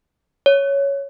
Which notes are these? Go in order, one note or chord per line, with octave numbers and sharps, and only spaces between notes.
C#5